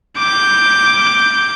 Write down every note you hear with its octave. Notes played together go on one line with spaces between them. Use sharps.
D6 G6